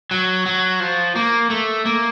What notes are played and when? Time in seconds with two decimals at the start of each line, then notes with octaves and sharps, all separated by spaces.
0.11 F#3
0.46 F#3
0.80 F3
1.15 A#3
1.50 A3
1.86 A#3